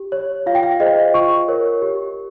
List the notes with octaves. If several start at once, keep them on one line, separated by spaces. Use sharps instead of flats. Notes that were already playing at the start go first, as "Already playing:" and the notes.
Already playing: G4
C#5
F4 F5
G5
F5
G#4 C5 D#5
F4 C#6
A#4 C#5
G4